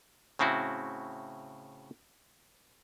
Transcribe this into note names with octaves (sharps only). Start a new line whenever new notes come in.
A2 C#3 C4 E4 F#4